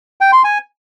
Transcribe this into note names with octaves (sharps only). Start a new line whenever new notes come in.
G5
C6
G#5